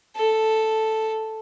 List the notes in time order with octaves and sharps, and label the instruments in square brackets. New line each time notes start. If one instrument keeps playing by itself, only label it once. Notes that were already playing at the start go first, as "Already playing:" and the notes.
[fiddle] A4